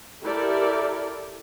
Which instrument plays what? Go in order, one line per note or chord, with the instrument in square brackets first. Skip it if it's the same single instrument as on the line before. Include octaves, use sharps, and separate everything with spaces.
[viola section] E4 G4 A4 A#4 D5